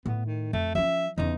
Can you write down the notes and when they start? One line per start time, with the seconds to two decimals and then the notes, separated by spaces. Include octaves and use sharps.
0.06 A2 B3
0.26 D#3
0.53 F2 A3
0.75 F3 C#4 E5
1.18 E2 C#3 D#4